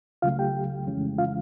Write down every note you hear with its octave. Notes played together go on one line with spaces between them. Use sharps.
C#2 C#3 F#3 A3 F4 F5
G4 G5
F2 C#3 E3 G#3 C#4
F4 F5